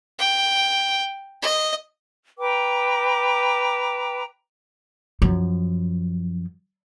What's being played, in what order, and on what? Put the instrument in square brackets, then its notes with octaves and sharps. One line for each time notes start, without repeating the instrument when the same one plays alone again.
[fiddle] G5
D#5
[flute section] B4 G5 A#5 D6
[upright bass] F#2 F3